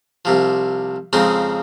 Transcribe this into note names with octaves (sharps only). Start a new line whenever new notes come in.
C2 C3 F3
F2 C#3 G#3 C4 D#4